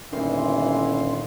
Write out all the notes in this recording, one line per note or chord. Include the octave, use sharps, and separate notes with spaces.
G1 A#2 D#3 E3 C#4 C6